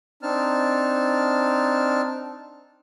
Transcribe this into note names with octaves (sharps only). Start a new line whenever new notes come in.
C4 D4 D#4 A5 F6